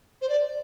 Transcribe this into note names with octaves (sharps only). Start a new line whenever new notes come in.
C5
D5